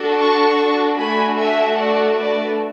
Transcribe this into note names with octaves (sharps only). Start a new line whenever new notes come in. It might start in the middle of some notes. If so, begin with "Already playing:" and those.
Already playing: D4 F#4 A4
A5 C#6
A3 D4 F#4 A4 G#5 B5
E5 G#5
D5 F#5
B4 D5